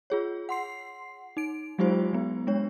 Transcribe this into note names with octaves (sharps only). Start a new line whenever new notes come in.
F4 G#4 C#5
F#5 C6 C7
D#4 D7
F#3 G#3 D#4 F4 G4 C5
F#3 B3
G#3 D4 C#5